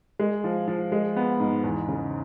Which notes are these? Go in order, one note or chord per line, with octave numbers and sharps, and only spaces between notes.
G#3
F3
F3
G#3
B3
G#2
E2
C#3